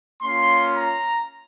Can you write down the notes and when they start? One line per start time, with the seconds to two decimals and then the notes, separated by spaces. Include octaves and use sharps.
0.22 A#3 C#4 F4 C6
0.75 A#5